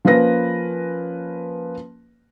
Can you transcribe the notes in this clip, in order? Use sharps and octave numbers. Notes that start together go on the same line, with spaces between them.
F3 A#3 C#4 B4 A#6